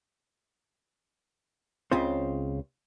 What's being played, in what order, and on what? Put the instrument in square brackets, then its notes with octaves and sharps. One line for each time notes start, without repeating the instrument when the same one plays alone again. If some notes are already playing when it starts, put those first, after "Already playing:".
[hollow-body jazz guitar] C#2 C#3 C4 F4 C5